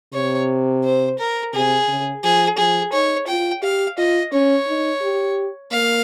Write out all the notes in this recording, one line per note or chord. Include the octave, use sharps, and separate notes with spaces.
C3 C#5
C5
A#4
C3 G#4
C#3
F3 G#4
F3 G#4
D#4 C#5
F4 G5
G4 F5
F4 D#5
C#4 C#5
D#4
G4
A#3 F5